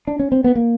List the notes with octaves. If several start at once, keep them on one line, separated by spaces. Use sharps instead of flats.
D4
C#4
C4
B3
A#3